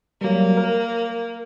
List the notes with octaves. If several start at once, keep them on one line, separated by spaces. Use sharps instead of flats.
F#3 G3 A#3
A#4